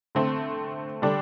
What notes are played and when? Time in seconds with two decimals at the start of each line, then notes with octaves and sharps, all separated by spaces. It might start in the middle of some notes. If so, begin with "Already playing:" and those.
0.15 D3 A3 C4
1.02 D3 G3 D4